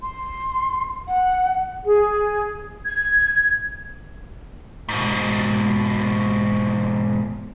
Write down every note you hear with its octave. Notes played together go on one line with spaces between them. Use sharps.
C6
F#5
G#4
G#6
G#2 B2